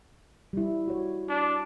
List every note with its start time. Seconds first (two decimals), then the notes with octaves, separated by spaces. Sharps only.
0.53 G3 E4
0.88 F#4 C#5
1.29 D4